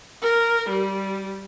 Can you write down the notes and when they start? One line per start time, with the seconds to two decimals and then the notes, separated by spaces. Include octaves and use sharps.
0.22 A#4
0.70 G3